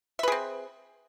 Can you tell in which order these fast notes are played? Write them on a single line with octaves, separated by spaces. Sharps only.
E5 B4 G#4 C4